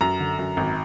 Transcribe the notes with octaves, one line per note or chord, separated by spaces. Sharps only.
F#2 A#5
D3
F#2
G#1